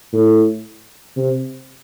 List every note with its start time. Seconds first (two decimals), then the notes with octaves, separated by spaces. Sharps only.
0.13 A2
1.16 C3